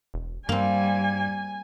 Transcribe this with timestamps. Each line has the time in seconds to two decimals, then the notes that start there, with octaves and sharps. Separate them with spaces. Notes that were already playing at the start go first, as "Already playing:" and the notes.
0.14 E1
0.49 G2 G3 A#3 C4 G#5